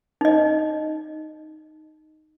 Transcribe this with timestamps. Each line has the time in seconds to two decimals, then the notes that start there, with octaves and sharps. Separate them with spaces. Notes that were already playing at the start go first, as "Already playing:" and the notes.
0.21 D#4 D#5